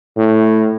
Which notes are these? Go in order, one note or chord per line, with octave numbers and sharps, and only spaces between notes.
A2